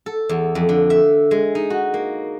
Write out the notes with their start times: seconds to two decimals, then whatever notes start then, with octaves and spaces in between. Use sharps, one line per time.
0.06 A4
0.29 E2
0.55 F2
0.69 D3
0.90 E5
1.31 G#3
1.55 D#4
1.70 F#4
1.94 A#3